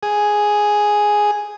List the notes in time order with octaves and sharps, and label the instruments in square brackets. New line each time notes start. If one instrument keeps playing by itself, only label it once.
[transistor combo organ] G#4